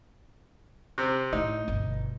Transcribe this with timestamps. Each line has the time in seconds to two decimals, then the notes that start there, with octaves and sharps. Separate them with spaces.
0.98 C3 C4
1.33 A2 D#4
1.68 G1 B2